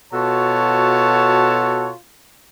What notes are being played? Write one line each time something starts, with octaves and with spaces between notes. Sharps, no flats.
B2 F4 F#4 A4 C#5 A5